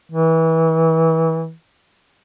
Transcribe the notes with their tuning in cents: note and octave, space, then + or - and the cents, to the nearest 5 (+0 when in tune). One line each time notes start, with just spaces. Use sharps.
E3 -25